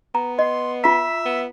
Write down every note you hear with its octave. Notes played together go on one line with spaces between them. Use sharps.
B3 A#5
D#5 C6
F4 E5 A#5 B6
B3